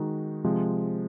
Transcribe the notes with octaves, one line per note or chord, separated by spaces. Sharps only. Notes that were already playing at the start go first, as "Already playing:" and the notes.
Already playing: D#3 G#3 D#4 F#4
C3 F3 G#3